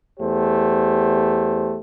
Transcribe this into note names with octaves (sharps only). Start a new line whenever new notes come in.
E2 A3 G4 C5